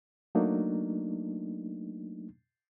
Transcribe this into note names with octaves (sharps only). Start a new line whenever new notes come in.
F#3 A3 A#3 D4 D#4